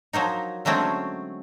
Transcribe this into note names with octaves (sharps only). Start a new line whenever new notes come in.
F3 F#3 A#3 D#4
D3 F#3 G#3 A3 C4 C#4